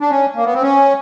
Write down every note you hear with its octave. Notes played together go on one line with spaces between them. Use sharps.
D4
C#4
A#3
B3
C4
C#4